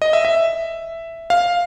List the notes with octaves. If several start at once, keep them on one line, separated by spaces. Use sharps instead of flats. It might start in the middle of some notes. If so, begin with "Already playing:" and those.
D#5
E5
E5
F5